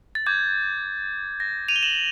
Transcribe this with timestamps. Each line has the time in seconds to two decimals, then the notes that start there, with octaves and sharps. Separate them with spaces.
0.15 A6
0.26 D6 G6 G#6
1.40 A#6
1.68 D#7 F7
1.76 G7
1.83 E7 F#7